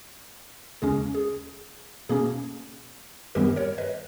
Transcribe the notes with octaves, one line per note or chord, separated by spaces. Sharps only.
D#2 C#3 G#3 C#4 G#4
G#4
B2 A#3 C#4 G#4
G2 D#3 G3 B3 G4 A#4
A#4 C#5
B4 D#5